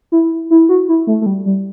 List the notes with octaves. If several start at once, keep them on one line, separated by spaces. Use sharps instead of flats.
E4
E4
F#4
E4
A3
A3
G3
G3